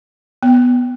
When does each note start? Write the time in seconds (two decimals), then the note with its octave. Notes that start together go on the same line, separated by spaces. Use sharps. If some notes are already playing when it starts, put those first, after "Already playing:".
0.43 B3